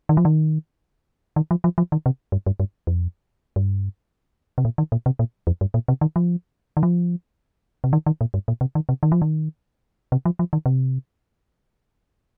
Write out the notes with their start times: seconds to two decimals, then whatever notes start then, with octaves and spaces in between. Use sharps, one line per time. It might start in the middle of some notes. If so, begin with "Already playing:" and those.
0.09 D#3
0.17 F3
0.25 D#3
1.36 D#3
1.51 F3
1.64 F3
1.78 F3
1.92 D#3
2.06 C3
2.32 G2
2.46 G2
2.60 G2
2.87 F2
3.56 G2
4.58 C3
4.65 A#2
4.78 D#3
4.92 A#2
5.06 C3
5.19 A#2
5.47 F2
5.61 G2
5.74 A#2
5.88 C3
6.01 D#3
6.16 F3
6.77 D#3
6.83 F3
7.84 C3
7.93 D#3
8.06 D#3
8.21 A#2
8.34 G2
8.48 A#2
8.61 C3
8.75 D#3
8.89 C3
9.03 D#3
9.12 F3
9.22 D#3
10.12 C3
10.25 F3
10.39 F3
10.53 D#3
10.66 C3